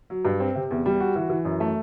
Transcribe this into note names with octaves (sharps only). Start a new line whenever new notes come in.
F#3
G2
C4
C3
E2
G3
F#4
E3
E3
F#2
A3